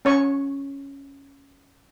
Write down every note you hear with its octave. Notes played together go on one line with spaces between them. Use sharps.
C#4 C#5 C#6